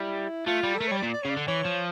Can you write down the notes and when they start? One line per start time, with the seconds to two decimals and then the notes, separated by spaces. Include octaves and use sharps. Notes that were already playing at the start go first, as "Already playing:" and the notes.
Already playing: G3 E4
0.46 A3 F4
0.63 G3
0.75 A4
0.80 A3 A#4
0.88 G3 C#5
0.97 D5
1.03 A#2
1.13 D5
1.22 C#5
1.25 C#3
1.29 D5
1.37 D3
1.48 E3 C#5
1.65 F3